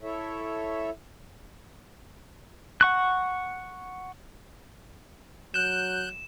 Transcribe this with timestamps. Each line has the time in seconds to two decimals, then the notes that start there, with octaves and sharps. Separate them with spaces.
0.01 E4 A4 C#5 E5
2.81 F#5 C#6 F#6
5.54 F#3 F#6 G6 E7